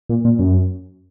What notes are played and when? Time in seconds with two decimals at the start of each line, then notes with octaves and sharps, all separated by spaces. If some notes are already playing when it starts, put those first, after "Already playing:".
0.09 A#2
0.25 A#2
0.39 F#2